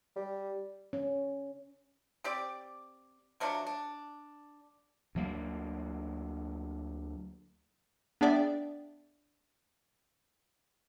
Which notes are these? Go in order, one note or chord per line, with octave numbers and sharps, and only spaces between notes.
G3
C#4
C4 G4 D5
F3 F#3 A3 D4
D4
D2 F#3 A#3
B3 D4 G#4 D5 E5 G5